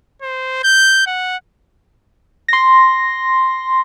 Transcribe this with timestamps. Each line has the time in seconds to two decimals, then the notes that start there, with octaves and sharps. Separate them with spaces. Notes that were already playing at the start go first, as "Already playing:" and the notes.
0.22 C5
0.63 G6
1.07 F#5
2.48 C6 A#6